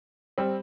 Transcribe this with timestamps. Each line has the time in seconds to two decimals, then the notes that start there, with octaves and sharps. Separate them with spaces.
0.38 G3 C4